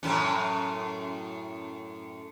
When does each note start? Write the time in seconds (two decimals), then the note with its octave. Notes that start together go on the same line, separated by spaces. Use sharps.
0.03 F#2 A2 C#4